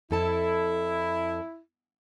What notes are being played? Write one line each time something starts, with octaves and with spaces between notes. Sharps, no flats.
F2 E4 A4 A5